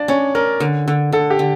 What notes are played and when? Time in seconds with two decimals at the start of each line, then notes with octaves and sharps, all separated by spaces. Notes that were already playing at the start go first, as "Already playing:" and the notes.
Already playing: D4 D5 F5
0.08 C#4 C#5
0.35 C#4 A#4
0.60 D3
0.88 D3
1.12 D3 A4
1.30 G4
1.39 D3